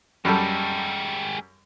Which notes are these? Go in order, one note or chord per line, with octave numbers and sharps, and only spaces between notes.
F#2 G3 G#3 G4 A4